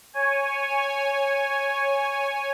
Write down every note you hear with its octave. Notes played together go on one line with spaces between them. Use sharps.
C#5 G#5